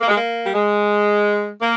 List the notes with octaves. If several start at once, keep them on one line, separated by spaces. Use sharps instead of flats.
A#3
G#3
A#3
G3
G#3
A#3